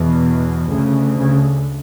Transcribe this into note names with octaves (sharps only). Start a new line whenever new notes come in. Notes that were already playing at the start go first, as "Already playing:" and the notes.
Already playing: E2 B2
D2 C#3
C#3